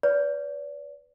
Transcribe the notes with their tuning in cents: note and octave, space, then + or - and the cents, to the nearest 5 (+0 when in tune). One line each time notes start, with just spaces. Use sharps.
B4 +15 D5 -35